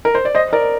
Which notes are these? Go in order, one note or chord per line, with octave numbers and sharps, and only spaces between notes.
A#4
C5
D5
C5 D#5
A#4 D5